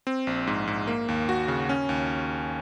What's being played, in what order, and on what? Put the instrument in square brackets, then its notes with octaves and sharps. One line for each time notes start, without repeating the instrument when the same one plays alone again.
[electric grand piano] C4
A#1
G#2
G#2
A#3
D#2
F#4
C#3
C#4
D#2